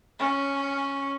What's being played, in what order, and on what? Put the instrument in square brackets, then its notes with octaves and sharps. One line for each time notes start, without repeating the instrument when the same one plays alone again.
[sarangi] C#4